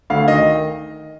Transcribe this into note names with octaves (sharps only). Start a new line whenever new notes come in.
D2 F5
D#3 D#5